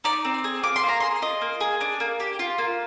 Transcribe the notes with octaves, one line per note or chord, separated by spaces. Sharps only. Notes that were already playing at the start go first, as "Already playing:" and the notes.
D#4 D5
C4
G#4
F4 D6
C6
A#3
A#5
G#4 C6
F4 D#5
A#3
G#4
D4
A#3
G4
F4
A#3